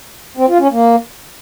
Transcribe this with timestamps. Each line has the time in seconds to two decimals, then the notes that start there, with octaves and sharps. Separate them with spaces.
0.37 C4
0.48 F4
0.59 C#4
0.70 A#3